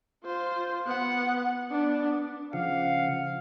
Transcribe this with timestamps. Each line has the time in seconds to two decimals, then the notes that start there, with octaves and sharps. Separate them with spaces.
0.23 F4 C5
0.86 B3 F#5
1.71 B3 D4
2.53 C#3 F3 F5 F#5